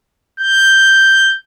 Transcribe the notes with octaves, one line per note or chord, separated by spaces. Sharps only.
G6